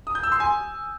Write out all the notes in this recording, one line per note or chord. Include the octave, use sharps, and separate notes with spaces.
D#6
G6
E6
C6
G#5